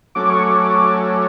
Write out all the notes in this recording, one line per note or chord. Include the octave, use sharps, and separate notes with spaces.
F#3 A3 C#4 D6
C#6
D6